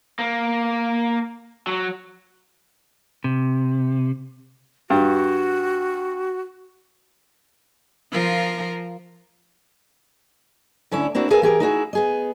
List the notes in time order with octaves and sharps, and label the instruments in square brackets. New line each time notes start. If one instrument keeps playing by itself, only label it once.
[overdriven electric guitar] A#3
F#3
[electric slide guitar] C3
[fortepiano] G2 [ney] F#4
[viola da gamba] F3 F4 A#4
[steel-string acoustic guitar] D2 D3 C#4 E4
A#3 C4 D4 E4 F#4
G#4 A#4 B4 E5 F5 G#5
E3 G4 G#4 A#4
D#4 E4 F#4 G#4
B3 G#4 D#5